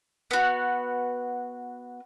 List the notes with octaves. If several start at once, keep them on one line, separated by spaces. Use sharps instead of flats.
B3 F#4